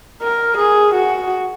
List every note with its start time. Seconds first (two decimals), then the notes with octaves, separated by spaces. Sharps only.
0.22 A#4
0.57 G#4
0.94 F#4